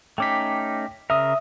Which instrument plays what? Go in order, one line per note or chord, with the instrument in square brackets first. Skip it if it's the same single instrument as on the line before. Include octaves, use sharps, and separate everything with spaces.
[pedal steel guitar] A3 C#4 D#4 [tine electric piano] G5 D6 B6
[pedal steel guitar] C#3 A#4 [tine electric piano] E5 D#6